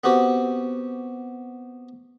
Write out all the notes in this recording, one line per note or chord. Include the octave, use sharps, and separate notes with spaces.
B3 C4 F#4 G4